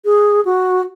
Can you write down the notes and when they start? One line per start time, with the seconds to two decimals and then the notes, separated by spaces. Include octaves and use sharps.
0.05 G#4
0.45 F#4